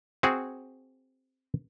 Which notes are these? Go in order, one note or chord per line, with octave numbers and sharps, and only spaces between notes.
C4 F#4 G#4